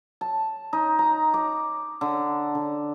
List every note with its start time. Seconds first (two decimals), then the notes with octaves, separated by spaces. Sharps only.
0.21 A5
0.73 D#4
0.99 A#5
1.34 D6
2.01 D3
2.55 D3